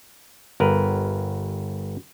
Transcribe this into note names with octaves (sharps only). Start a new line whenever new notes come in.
G1 A#4 B4